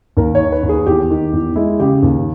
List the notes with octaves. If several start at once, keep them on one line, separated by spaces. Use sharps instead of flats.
D#2 A#4
C#5
D#3
B4
D#2
G#4
E2 G4
D#3
E2
G#3 E4
C#3 G4
D#2